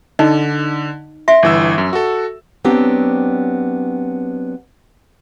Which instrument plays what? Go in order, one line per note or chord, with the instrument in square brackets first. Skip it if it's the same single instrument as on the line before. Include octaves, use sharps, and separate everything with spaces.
[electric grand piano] D3 [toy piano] D#4 D#5
[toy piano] E5 [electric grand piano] C6
[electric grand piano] G1 E3 E6
F#2
F#4 A4
[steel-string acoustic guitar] F#3 B3 C4 D4 G4